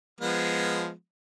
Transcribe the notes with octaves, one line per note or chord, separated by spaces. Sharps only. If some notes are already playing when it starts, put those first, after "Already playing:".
F3 G#3 B3